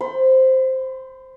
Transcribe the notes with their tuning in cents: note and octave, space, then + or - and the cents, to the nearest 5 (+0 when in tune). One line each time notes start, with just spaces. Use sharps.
C5 +0 B5 +35